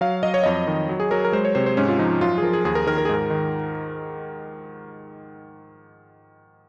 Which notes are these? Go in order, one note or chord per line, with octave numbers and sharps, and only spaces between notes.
F#3 F5
F#3 D#5
C#5
F2 D#5
D#3
F#3
G#4
F#3 A#4
A#4
G#3 C5
C#5
C3 C5
C5
G#2 C#4
F4
F3 D#4
F#2 F4
G#4
F3 A#4
G#4
D#2 G#4
A#4
D#3 A#4
A#4
G#4
G#2 A#4
D#3